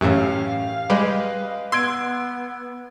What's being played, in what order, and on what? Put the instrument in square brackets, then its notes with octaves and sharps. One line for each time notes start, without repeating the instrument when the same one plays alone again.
[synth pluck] F#2 A2 E3 [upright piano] C#4 G4 [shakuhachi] F5
[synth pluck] G3 G#3 [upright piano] B4 D#5
[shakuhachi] B3 [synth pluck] C6 [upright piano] E6 G#6 D7